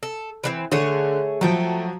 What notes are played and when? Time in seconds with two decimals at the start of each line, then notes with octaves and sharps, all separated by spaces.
0.03 A4
0.44 E3 G#3 C4
0.72 D3 A3 G#4 C#5
1.41 F3 F#3 A3 G5